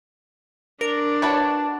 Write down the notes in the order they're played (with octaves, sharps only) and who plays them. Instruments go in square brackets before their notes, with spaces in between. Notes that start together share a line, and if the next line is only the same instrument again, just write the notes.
[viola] D4 [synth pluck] A#4
[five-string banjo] F#4 B4 C#5 [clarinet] A5